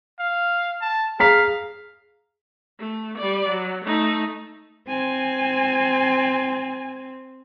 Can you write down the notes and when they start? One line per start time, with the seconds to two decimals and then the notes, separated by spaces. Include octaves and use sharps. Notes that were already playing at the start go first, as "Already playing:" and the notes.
0.19 F5
0.81 A5
1.20 G#4 F5 A#5 B6
2.79 A3
3.18 G3 D5
3.49 F#3
3.85 A3 D#4
4.88 C4 G#5